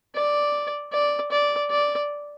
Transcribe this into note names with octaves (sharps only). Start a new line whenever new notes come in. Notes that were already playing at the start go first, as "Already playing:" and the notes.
D5
D5
D5
D5